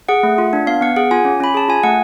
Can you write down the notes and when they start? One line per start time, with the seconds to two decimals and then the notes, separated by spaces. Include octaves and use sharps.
0.09 G#4 F#5
0.23 A3
0.38 F4
0.53 D4
0.67 B3 F5
0.81 B3 F#5
0.96 G#4 F#5
1.11 F4 G#5
1.25 C#4
1.40 C#4 B5
1.54 G#4 A5
1.68 F4 G#5
1.83 A3 F#5